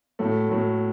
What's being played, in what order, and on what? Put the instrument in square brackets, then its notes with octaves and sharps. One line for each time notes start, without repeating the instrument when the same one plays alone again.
[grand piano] A2 F#3 A3
A2 F#3 A3